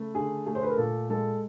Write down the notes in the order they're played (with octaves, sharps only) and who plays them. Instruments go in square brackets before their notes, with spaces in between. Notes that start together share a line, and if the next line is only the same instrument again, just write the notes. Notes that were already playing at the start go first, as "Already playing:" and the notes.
Already playing: [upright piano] C#3 A3
D3 G#4
A3 G#4
C5
B4
A#4
A#2 A4
G#3 A4